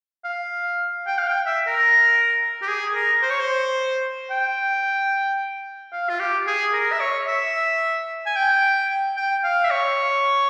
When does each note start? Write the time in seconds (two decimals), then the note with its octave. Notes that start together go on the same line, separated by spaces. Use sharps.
0.24 F5
1.07 G5
1.18 F5
1.27 G5
1.46 E5
1.67 A#4
2.62 G4
2.68 G#4
2.95 A#4
3.22 C5
3.30 C#5
3.40 C5
4.31 G5
5.92 F5
6.09 F4
6.20 G4
6.47 G#4
6.73 A#4
6.92 E5
7.00 C#5
7.27 E5
8.26 G#5
8.36 G5
9.17 G5
9.44 F5
9.65 E5
9.71 C#5